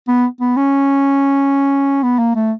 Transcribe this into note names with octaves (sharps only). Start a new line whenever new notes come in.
B3
B3
C#4
B3
A#3
A3